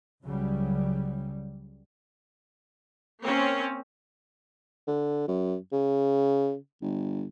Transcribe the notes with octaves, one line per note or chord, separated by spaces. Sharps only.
C#2 C#3 F#3 G3
A#3 C4 C#4 C#5
D3
F#2
C#3
G1